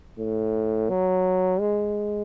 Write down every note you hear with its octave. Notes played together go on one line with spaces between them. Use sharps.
A2
F#3
G#3